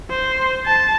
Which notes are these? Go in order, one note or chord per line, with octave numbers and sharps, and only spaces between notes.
C5
A5